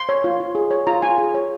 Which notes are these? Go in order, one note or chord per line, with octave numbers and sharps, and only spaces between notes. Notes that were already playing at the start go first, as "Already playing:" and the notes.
Already playing: C6
C#5
F4
F4
G#4
C#5
F4 A#5
F4 G#5
G#4
C#5